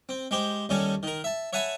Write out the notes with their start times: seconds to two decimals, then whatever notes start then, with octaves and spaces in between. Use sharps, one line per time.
0.09 C4
0.31 G#3 G4 C5
0.69 D#2 G3 C#4 A4 G#5
1.03 D#3 A#4
1.24 E5 A5
1.53 C#5 E5 F#5 G#5 A5 B5